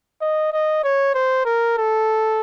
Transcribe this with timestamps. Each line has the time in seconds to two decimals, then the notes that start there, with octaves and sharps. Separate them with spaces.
0.21 D#5
0.53 D#5
0.84 C#5
1.14 C5
1.46 A#4
1.78 A4